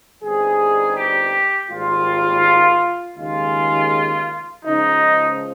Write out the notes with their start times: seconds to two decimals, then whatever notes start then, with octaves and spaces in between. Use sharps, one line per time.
0.23 G1 G2 G3 C4 D#4 G#4
0.96 G4
1.69 G#1 G#2 G3 A#3 F4
3.17 D#2 C#3 G#3 F4
4.64 C#2 C#3 F3 D#4